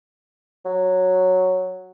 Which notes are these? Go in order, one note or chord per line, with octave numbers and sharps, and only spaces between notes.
F#3